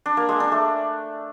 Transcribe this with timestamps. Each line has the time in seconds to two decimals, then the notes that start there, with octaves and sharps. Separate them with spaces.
0.06 D4
0.17 A#3
0.29 G#3
0.40 D4
0.52 A3